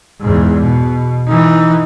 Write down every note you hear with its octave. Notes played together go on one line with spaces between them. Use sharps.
E2 G#2
B2
E3 D#4